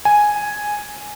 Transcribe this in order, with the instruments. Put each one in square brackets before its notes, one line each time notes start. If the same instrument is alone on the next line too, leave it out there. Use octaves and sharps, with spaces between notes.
[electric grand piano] G#5